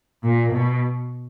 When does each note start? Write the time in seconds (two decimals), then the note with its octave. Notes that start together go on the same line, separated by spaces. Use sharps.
0.23 A#2
0.53 B2